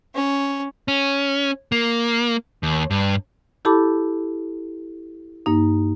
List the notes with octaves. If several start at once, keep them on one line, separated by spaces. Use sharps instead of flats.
C#4
C#4
A#3
D#2
G2
E4 G4 A4 A5 B5 D6
G2 A#3 D#4